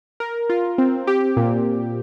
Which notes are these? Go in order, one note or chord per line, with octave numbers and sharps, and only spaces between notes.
A#4
F4
C4
G4
A#2